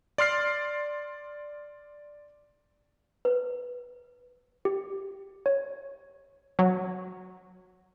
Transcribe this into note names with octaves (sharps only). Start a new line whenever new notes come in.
D5 C6 F6 C7
B4
G4
C#5
F#3